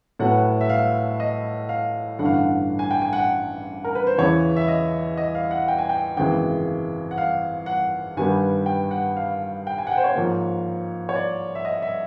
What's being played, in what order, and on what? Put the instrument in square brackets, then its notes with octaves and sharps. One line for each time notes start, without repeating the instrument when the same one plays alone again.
[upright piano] A2 F#3 B3 F#5
E5
F5
D#5
F5
A1 G2 D3 F#5
F5
F#5
G#5
G5
G#5
F#5
G5
A#4
B4
C5
E2 C#3 E3 C#5
E5
D#5
D#5
F5
F#5
G5
G#5
G5
G#1 F#2 C#3 E3 G#3 G5
F#5
F5
F#5
G2 D#3 G3 B3 G#5
G5
F#5
F5
G5
G#5
F#5
G5
C5
C#5
G#2 F3 A#3
C#5
D5
E5
D#5
E5